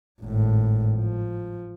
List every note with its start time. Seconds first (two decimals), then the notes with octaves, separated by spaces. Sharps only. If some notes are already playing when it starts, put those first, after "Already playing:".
0.22 G#1 A2
0.96 F3